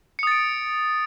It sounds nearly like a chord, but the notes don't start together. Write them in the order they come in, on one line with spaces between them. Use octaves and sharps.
C#7 D#6 A6 D7